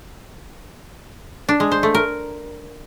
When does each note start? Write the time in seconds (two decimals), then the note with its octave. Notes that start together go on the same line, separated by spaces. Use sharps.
1.49 D4
1.60 G#3
1.71 C5
1.83 A3
1.94 A#4